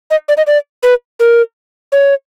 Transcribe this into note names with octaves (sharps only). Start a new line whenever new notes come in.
D#5
D5
D#5
D5
B4
A#4
C#5